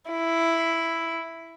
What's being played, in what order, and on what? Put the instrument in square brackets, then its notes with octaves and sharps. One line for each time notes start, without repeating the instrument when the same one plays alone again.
[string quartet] E4